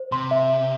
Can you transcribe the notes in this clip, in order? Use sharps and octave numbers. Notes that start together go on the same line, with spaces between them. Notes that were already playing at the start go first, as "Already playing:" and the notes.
Already playing: C5
C3 C6
E5
E5